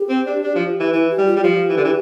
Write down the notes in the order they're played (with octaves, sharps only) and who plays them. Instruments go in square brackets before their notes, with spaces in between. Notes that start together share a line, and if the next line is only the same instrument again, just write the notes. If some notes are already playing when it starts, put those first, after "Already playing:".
Already playing: [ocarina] G4
[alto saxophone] C4
D4
D4
F3
E3
[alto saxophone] E3 [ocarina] E4
[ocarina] G4
[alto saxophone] G3
[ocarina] F4
[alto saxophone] G3
[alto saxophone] F3 [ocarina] G4
[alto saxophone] E3
D3
E3